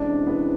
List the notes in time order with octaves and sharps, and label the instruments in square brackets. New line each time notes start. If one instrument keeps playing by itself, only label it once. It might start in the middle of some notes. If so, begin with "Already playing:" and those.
Already playing: [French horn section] C3 E3 G#3 C#4 E4 [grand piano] D4
[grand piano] B3